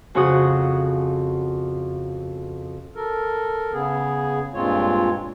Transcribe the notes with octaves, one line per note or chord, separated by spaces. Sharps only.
F2 C#3 F#4 D#6
A4 A#4
C#3 B3 G#4
G2 A#2 G#3 C4 F4 C#5